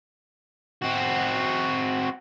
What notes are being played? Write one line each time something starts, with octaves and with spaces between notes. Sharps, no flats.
C4 F#4